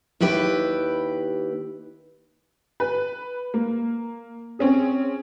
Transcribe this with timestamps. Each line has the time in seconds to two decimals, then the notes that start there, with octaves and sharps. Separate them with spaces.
0.20 D#2 E4 G4 B4 G5
2.80 B4
3.54 A#3
4.59 C4 C#4 G#4